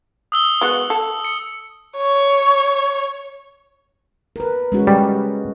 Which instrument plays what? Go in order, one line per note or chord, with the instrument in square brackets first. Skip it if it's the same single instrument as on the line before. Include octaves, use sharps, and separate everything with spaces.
[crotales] D#6 E6 G7
[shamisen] G#3 B3 F#4
A4
[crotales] C#7
[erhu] C#5
[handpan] A#4 B4
G#3 C#4 F#4
[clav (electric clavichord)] G3